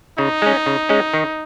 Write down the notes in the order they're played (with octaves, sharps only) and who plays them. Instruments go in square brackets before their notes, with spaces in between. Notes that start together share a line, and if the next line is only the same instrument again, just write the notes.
[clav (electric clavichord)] C#3 [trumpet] D#4
[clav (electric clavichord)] G#3 C#4
C#3
G#3 C#4
D#3